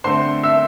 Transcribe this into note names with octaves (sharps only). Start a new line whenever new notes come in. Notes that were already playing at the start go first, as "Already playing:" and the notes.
D3 A3 C4 C5 C6
E5 E6